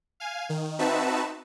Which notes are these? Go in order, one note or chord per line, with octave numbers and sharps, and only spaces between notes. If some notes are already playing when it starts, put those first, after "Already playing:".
F5 G#5
D#3
C4 D#4 F#4 B4 E5 A5